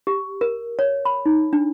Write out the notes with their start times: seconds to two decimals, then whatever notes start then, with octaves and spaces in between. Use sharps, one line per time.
0.07 G4
0.41 A#4
0.79 C#5
1.05 B5
1.26 D#4
1.53 D4